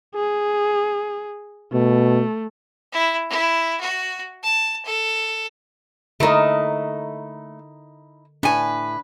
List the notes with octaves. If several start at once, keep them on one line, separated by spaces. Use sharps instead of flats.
G#4
B2 A3
E4
E4
F#4
A5
A4
D3 A3 D#4 E4 A#4 D#5
A2 D4 B4 G#5